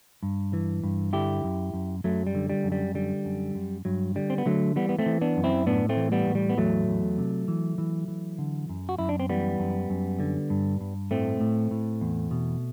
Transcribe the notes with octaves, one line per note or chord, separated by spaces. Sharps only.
G2
E3
G2
D3 E4 G4
F#2
F#2
F#2 F#3 A3
G3
D3
G3
F#2
G3
D3 G3
F#2
F#2
G2 F#3
D3 G3
C4
B3
D3 F#3 A3
E3 G3 B3
B3
A3 C4
E3
B3 D4
F#2
C4 E4
A2 B3 D4
A3 C4
E3
G3 B3
A2
G3
B3
E2 F#3 A3
E2
C3
E3
E3
E3
D3
F#2
F#4
F#2 E4
D4
C4
E3 G3 B3
F#2
F#2
D3
G2
G2
A2 A3 C4
A2
A2
E2
B2